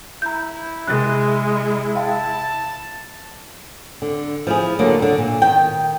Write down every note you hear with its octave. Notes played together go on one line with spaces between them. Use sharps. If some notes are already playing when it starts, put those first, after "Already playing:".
E4 A#5 G6
C3 G#3 F#6
F5 G5 A5
D3
F3 E4 G#4
D2 D3 F#3 A#3
D3
A#2
D#3 G5